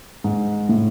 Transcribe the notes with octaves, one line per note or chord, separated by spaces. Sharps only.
G#2
A2